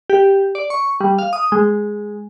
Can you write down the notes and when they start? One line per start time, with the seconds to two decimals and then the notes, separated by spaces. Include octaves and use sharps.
0.10 G4
0.55 D5
0.70 C#6
1.00 G3
1.19 F5
1.33 D#6
1.52 G#3